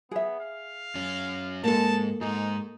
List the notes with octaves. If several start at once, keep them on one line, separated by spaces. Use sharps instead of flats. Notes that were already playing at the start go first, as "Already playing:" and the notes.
B3 G#4 E5
F5
F#2 C#4
G#2 A#3 A4 A5
G#2 D#4 G#4